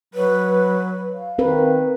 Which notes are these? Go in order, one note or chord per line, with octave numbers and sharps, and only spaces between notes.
F#3 B4
F5
D#3 C4 A#4 B4